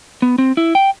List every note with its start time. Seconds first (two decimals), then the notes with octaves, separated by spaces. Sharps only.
0.22 B3
0.38 C4
0.57 E4
0.75 G5